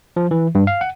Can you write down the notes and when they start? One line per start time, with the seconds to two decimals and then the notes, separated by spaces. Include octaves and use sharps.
0.16 F3
0.31 E3
0.55 G2
0.67 F5
0.81 F#5